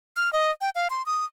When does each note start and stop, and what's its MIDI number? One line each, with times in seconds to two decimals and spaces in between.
0.17 0.32 89
0.33 0.51 75
0.61 0.70 79
0.75 0.88 77
0.90 1.05 84
1.06 1.25 87